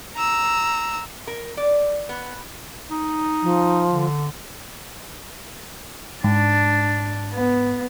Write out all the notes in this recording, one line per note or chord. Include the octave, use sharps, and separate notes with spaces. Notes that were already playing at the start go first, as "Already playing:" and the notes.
A#5 E6
A#4
D5
B3
D#4
F3
D3
G#2 D4
B3